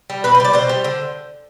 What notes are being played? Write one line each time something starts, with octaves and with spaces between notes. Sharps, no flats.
G3
B2 B4
C5
G3 D5
B2 C5
G3
D3